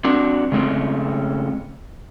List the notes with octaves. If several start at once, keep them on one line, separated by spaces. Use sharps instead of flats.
C4 D4 F#4
C#3 G#3 A3 C4 C#4